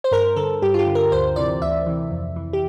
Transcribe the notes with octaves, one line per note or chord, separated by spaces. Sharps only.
C5
G2 A#4
D3 A4
G2 G4
F4
G4
D3
A#4
D2 C5
C3 E3 D5
D2 E5
C3 E3
F2
E3
G4